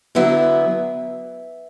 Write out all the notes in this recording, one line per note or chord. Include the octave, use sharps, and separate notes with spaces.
D3 F#3 B3 E4 E5